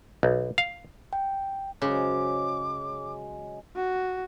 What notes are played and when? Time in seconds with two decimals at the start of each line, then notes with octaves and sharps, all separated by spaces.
0.23 B1
0.58 F5
1.13 G5
1.82 F#2 C#3 G#3 C5 D6
3.76 F#4